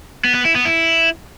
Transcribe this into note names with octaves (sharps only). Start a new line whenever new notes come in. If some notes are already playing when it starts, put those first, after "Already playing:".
B3
B3
E4
B3
E4